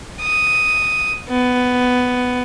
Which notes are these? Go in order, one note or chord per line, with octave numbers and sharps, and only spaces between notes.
D#6
B3